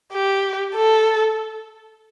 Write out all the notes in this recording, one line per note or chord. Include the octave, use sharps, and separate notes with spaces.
G4
A4